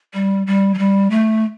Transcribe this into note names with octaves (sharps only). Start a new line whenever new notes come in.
G3
G3
F#3
G3
A3